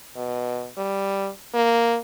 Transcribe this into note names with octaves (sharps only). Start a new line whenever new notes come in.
B2
G3
A#3